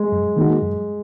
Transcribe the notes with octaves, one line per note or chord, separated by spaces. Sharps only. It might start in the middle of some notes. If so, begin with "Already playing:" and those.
Already playing: G#3
F#2
D#3 A#3 D#4 F#4
F#2